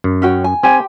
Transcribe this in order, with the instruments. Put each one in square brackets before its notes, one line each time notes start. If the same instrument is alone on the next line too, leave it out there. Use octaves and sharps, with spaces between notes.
[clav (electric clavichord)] F#2
[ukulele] C#4 F#4 G5
G#5
[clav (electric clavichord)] C4 [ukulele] G4 G5 [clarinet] G#5